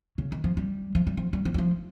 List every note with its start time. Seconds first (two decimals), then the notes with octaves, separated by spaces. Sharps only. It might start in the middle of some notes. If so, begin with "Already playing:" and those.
0.18 C#3
0.32 D#3
0.44 F3
0.57 G3
0.95 F3
1.07 G3
1.17 F3
1.33 G3
1.45 F3
1.54 G3
1.58 F3